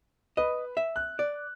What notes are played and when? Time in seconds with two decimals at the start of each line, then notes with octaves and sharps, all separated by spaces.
0.37 B4 D#5
0.77 E5
0.96 F#6
1.19 D5